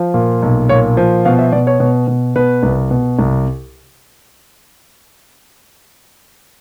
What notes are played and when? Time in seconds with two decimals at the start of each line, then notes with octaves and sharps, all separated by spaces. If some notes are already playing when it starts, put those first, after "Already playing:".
Already playing: F3
0.14 A#2
0.42 B1
0.69 A#2 C#5
0.97 F3
1.25 B2 F5
1.39 E5
1.52 B2 D5
1.67 C#5
1.80 B2
2.08 B2
2.36 B2 B4
2.63 C2
2.91 B2
3.19 C2